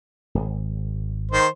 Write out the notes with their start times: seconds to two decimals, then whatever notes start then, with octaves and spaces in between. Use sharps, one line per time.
0.35 D1 G#1
1.31 D#3 C5